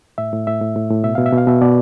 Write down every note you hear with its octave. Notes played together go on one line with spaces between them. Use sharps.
A2 E5
A2
A2 E5
A2
A2
A2
B2 E5
B2 F5
E5
B2 F5
B2 E5
B2 D5